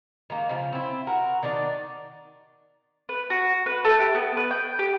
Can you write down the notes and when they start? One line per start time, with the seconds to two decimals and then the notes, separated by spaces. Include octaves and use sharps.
0.30 D#3 G#3 A#3
0.49 C#3 F3
0.73 C4 E4
1.07 F#4 A#4 F#5
1.43 D#3 D4 D#4 D5
3.09 B4
3.30 F#4
3.66 B4
3.85 A3
4.00 G4
4.15 B3
4.37 B4
4.51 G5
4.79 G4